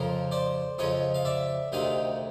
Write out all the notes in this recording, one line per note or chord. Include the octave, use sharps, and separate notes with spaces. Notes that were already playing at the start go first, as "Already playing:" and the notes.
Already playing: F2 C#3 F3 A#4 C5
C5 D5
F2 C#3 F3 C#5 D#5
F5
D5 E5
D2 C3 D#3 D#5 F5